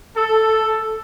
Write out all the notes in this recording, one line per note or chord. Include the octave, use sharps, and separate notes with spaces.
A4